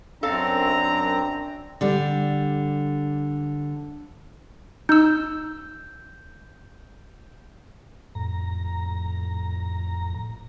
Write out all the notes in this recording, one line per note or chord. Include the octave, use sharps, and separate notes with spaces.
F#2 C4 D4 A4 F5 A#5
D3 G3
D#4 E6 G6
F2 A2 A#5